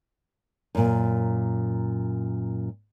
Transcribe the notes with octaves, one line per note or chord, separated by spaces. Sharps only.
F#2 A#2